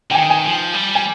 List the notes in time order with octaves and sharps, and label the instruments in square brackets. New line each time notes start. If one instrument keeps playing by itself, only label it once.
[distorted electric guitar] D3 [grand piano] G5
[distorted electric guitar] D#3 [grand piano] G#5
[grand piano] G#5
[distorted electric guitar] F3
G3
[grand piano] G#5